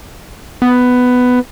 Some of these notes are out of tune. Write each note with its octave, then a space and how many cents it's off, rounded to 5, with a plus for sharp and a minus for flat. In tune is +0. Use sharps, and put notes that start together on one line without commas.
B3 +10